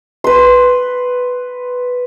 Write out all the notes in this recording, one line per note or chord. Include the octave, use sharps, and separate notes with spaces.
B4 C6